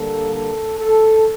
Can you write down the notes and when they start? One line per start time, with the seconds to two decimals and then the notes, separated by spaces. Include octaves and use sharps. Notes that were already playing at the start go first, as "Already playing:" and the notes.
Already playing: D3 G3 A#3 A4
0.35 A4
0.79 A4